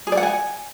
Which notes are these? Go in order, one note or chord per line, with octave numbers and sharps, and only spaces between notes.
G#4
D5
F#5
G#5